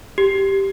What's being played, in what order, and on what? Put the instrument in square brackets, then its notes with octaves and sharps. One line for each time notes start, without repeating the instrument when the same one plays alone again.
[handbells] G4